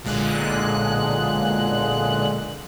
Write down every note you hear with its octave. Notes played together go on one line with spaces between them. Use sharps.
B1 A#2 D3 G#3 F#6